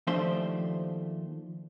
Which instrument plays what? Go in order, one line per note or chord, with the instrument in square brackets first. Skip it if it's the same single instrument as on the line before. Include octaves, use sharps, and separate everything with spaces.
[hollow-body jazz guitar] D#2 F3 A3 D4 C5 C6